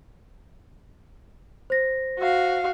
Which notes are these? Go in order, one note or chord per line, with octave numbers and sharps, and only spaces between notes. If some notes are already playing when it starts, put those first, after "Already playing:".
C5 A#6
F#4 F5